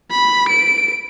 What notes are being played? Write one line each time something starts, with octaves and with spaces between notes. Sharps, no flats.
B5
D7